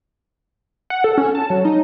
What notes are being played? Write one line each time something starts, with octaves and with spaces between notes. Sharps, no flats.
F#5
A4
C#4
A5
F#3
D#4